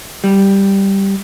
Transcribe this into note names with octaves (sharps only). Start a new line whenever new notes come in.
G3